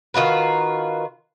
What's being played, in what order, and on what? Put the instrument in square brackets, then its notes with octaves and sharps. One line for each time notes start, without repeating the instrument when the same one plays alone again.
[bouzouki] D#3 F4 F#4 B4